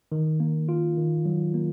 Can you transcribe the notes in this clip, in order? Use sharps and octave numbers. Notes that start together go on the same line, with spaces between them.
D#3
A#3
F4
D#3
F#3
A#3